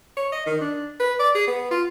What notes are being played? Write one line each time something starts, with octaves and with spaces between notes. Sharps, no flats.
C#5
D#5
D#3
D4
B4
D5
G#4
B3
F4